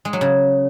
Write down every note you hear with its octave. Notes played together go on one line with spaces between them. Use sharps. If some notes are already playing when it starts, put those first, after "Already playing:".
G#3
F#3
C#3